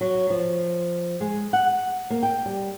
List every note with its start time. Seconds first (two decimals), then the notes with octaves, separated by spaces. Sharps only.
0.01 F#3
0.30 F3
1.21 G#3
1.53 F#5
2.10 A#3
2.23 G5
2.46 G3